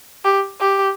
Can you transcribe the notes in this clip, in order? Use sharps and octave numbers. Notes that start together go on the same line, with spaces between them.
G4
G4